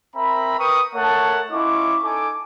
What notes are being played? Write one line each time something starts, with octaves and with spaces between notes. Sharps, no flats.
C4 A#4 E5 A#5 B5
A#4 B4 G5 C#6 D#6
A3 A#4 C#5 F#5 A5
C#4 E4 F4 D#5 C#6 D6
D#4 A4 G#5 D6